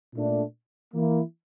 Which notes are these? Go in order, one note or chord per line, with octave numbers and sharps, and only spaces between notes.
A#2 A3 D4
E3 A#3 E4